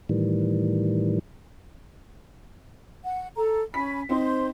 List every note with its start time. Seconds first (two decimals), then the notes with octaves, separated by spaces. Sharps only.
0.09 A2 D#3 E3 G3
3.04 F#5
3.36 A4 A#5
3.74 C#4 G#5 B5 B6
4.09 C4 D#4 C5 C6